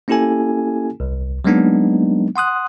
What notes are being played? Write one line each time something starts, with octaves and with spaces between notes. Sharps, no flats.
A#3 C#4 E4 G4 A4 G#5
C2
F#3 G#3 A#3 B3 D4 D#4
F#5 C6 D#6 F#6